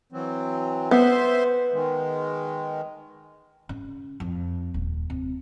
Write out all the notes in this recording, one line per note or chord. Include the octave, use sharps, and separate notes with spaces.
E3 F#3 C4
B3 C5 E5 C6
D#3 G#3
C#3
F2
D#1
C3